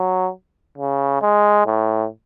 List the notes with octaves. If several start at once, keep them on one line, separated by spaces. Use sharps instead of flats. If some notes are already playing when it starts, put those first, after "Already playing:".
Already playing: F#3
C#3
G#3
A2